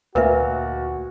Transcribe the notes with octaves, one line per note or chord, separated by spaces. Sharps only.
D2 A#2 F#4 A#4 B4 E5